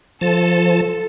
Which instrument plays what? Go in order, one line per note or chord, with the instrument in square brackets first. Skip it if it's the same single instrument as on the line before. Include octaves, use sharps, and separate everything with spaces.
[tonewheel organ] F3 A5 [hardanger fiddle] A4